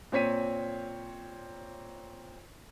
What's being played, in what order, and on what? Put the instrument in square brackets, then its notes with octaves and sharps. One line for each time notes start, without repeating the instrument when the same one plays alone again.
[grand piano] A#2 C4 C#5 B6 D#7